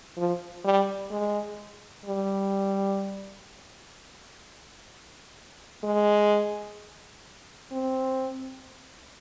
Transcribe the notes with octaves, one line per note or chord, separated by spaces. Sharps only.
F3
G3
G#3
G3
G#3
C4